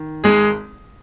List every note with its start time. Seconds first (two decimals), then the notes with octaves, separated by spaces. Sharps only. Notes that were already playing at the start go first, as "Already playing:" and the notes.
Already playing: D#3
0.24 G#1 G#3 G#4